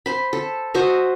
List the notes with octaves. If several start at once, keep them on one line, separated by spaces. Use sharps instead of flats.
C5 B5
A4
F#4 C5 D#5 E5